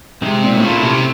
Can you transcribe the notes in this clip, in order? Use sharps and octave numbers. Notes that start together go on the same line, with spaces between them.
C3 G#3 C4 D#4
A#2
A2
A#2 A3 C#4 E4 A4 C5
C3